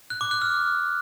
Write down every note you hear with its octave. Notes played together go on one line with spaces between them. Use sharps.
F#6
D6
F#6
F6